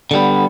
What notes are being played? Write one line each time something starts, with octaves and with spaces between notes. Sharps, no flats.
D3 G3 B3